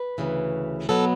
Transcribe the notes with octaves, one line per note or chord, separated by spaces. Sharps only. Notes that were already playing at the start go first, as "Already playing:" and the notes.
Already playing: B4
D2 C#3 E3
B2 F#3 B3 A4